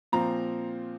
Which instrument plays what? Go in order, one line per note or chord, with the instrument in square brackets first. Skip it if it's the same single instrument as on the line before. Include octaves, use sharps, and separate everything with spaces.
[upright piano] A#2 F3 C4 A#5